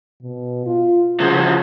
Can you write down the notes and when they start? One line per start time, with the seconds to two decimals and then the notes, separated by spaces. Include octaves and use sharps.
0.22 B2
0.66 F4
1.20 C#3 F3 F#3